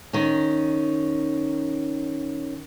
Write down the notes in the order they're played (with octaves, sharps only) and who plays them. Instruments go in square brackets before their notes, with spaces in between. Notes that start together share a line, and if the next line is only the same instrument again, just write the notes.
[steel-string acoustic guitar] D#3 C#4